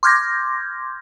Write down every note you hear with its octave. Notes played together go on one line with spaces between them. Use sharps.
C6 D6 F6 G6 G#6 A#6